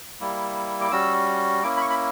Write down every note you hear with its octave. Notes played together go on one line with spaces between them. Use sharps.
G3 A#3 E4
D6
G3 C#4 F#4 E6
A#3 C#4 E4 D6
B5
C#6
B5